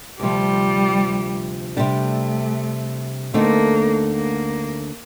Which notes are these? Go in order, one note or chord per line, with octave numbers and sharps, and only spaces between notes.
D2 C3 F3 G3
C3 G3 A3 D4 G4
D2 D3 A3 A#3 C4 D#4
A#3